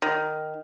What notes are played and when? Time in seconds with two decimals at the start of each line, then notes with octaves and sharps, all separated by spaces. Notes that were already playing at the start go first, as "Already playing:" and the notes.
0.02 D#3